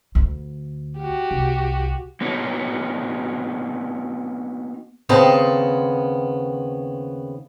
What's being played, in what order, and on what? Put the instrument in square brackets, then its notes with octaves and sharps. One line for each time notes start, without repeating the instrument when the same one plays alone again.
[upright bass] D2
[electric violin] F#4 G4
[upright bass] C2
[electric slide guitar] A#3 B3 D#4 F#4 C#5
[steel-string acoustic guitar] D#2 C#3 B3 C4 A5 A#5